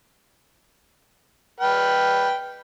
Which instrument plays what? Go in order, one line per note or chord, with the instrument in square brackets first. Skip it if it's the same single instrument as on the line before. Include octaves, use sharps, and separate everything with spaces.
[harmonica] B4 G5 F6